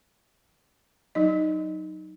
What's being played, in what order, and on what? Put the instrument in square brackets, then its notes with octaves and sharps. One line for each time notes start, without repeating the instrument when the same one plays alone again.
[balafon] F#3 D#4 D#5